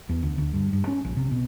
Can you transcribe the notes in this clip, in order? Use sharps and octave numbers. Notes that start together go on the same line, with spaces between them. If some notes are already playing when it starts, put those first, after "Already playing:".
E2
D2
D2
G2
G2
C#4
A#1
C3
B2